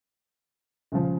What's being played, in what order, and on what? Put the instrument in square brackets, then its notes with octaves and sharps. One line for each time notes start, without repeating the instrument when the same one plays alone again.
[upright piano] C#2 C#3 F3